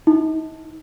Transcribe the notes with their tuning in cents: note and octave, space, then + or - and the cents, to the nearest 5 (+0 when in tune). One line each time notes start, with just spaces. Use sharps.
D#4 +40